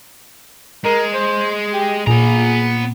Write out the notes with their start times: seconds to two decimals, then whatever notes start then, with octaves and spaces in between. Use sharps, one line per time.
0.85 G#3 A#4
1.14 C5
1.73 G4
2.07 A#2 B3 G#4 A#5